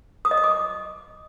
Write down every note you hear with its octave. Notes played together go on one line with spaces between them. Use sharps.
D#6
D#5
D#6
D6